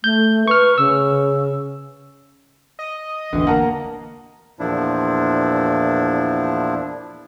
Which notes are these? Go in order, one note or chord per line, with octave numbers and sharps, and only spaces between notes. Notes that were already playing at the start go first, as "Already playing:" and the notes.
A3 G6
B4 C#6 F6
C#3 E6
D#5
E1 A1 D3 E3
A#3 A#4 F#5 A5 A#5
E2 A#2 F3 D4 E4